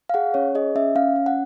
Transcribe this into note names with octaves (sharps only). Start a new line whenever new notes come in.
F5
G#4 F#5
C#4 C#5
G#4 D#5
C#4 E5
C#4 F5
C#4
F#5